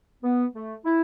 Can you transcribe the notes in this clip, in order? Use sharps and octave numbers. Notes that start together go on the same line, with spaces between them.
B3
A3
E4